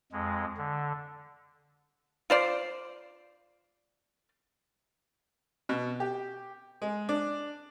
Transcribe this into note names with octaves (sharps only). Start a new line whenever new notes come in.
F2 G#3
D3
F4 C5 D5
B2
G4
G#3
D4